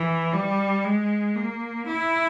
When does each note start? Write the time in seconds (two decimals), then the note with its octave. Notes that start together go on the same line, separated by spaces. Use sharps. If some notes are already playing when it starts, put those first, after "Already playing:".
Already playing: E3
0.33 G3
0.84 G#3
1.36 A#3
1.87 E4